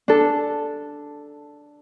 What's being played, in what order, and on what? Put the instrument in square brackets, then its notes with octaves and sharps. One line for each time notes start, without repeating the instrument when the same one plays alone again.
[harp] D4 A4